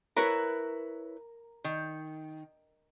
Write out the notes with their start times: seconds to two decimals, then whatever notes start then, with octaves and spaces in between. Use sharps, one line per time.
0.16 E4 A#4 B4 C#5
1.64 D#3